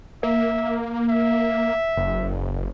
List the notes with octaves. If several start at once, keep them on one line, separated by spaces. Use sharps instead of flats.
A#3 E5
E5
F#1